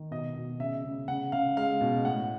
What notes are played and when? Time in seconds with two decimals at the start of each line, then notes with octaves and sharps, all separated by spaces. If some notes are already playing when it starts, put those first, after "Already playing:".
Already playing: D#3
0.11 B2 D#5
0.36 B2
0.60 C#3 E5
0.85 C#3
1.08 C#3 F#5
1.32 C#3 F5
1.57 G#3 F5
1.81 B2
2.05 A2 F#5